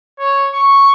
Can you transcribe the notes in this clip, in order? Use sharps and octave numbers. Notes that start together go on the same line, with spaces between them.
C#5
C#6